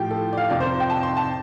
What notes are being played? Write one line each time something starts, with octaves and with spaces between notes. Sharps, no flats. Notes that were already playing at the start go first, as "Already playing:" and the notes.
Already playing: A2 F3 G4
A4
D5
F5
F2 C3 F3 D5
C5
G5
A5
C6
A5